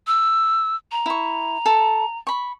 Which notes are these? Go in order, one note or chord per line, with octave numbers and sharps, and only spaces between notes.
E6
A#5
E4 C#6
A4
B5 C#6